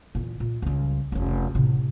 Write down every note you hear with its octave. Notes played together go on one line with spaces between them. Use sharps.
E2 A#2
A#2
C#2 G3
F1 C#4
A2 C3